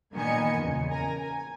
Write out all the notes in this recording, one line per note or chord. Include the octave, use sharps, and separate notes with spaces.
A#2 D#3 B3 D#5 G#5 C#7
E2 A#2 C#3
A#4 G#5 A#5
G#5